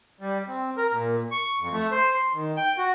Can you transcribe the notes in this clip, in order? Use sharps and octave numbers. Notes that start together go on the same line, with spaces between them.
G3
C4
A#4
A#2
C#6
F2
A3
C5
C6
D#3
G5
F#4